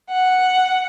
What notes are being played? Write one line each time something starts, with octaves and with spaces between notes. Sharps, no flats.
F#5